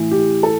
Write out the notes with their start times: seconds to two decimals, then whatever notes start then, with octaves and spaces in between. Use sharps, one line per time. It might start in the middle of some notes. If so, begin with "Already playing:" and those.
Already playing: A2 E3
0.11 G4
0.43 A4